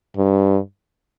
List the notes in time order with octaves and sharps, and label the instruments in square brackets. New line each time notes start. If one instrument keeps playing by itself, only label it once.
[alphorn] G2